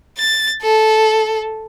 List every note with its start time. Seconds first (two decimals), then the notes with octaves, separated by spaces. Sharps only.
0.18 A6
0.62 A4